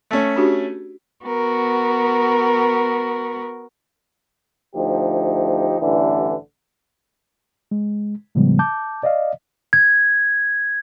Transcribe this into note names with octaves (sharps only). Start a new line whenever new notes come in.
A3 C#4
D4 F#4 G4
B3 F#4 A#4
D2 F3 D#4 G4
A1 G2 D3 E3
G#3
A2 C#3 F3 G3 G#3 B3
A5 D6 G6
D5 D#5 F5
G#6